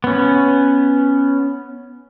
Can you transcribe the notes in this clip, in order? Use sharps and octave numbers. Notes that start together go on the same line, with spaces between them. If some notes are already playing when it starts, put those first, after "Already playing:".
B3 C#4